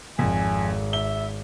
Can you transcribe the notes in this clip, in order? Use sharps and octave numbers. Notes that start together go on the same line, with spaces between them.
G#1 F2 G#5
E5 G7